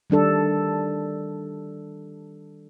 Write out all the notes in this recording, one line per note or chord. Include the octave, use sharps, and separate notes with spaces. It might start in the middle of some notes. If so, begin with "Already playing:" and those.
D#3 G3 D4 A4